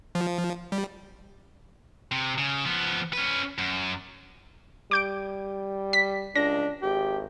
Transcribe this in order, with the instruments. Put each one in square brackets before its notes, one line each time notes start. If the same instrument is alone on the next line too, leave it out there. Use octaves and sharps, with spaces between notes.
[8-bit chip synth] F3
G3
[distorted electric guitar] C3
C#3
F3 B3
C#4 B4
F#2
[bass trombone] G3 [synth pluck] D6 G6 D7
[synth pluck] B6
[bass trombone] C#2 [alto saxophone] D4 [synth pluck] A#6
[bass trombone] G#1 [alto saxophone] G4